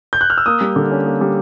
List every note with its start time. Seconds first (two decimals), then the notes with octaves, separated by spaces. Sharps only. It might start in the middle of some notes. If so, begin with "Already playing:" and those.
0.13 G6
0.21 F#6
0.30 F6
0.38 E6
0.46 A#3 D#6
0.61 G3
0.76 D3
0.91 C#4
1.06 A#3
1.21 G3